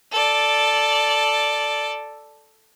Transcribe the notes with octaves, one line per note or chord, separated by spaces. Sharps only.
A4 D5